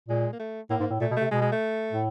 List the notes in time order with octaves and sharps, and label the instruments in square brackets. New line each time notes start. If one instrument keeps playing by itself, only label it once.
[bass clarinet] A#2 [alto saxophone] G#3
[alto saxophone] A#3
A3
[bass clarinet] A2 [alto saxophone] A#3
[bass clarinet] G#2
A2
[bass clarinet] A#2 [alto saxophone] A3
[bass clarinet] B2
[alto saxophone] A3
[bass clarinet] C3
[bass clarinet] B2 [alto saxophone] G#3
[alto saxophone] G#3
A3
[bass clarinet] A2